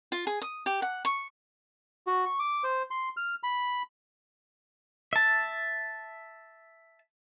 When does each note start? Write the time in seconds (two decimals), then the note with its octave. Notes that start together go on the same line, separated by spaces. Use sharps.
0.12 F4
0.27 G#4
0.42 D#6
0.66 G4
0.82 F#5
1.05 C#6
2.07 F#4
2.26 C#6
2.39 D6
2.64 C5
2.91 C6
3.17 F6
3.43 B5
5.13 E5 A5